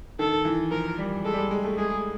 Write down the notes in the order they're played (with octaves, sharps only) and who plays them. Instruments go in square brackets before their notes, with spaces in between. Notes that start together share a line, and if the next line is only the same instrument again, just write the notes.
[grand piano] D#3 [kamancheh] A4
[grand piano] E3
[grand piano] F3 [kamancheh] A#4
[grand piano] G3
[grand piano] G#3 [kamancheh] A4
[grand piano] G3
G#3
G#3
A3
[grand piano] G#3 [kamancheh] G#4